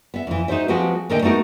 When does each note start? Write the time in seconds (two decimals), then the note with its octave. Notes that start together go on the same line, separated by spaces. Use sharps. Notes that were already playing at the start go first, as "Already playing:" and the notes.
0.14 B3 E5
0.27 F2 E3
0.48 D#4 F4 F#4 C5 E5
0.68 F3 G#3 C4 F#4 G4 B4
1.10 A2 D3 D#3 A#3 D#5 G5
1.22 A3 B3 D#4 F#4 A#4